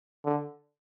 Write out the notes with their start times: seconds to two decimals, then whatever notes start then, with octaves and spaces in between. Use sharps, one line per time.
0.25 D3